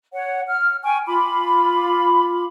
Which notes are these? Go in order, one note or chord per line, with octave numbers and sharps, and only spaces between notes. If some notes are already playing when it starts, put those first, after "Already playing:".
C#5 F#5
F6
G5 G#5 C#6
F4 B5 D6